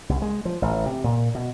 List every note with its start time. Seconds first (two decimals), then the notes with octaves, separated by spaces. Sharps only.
0.09 C2
0.22 G#3
0.45 F3
0.62 A1
0.86 C3
1.04 A#2
1.35 B2